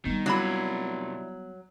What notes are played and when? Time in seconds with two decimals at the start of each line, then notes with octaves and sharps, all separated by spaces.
0.05 D#3 G3 B3
0.26 C3 F#3 D4 E4 F4 B5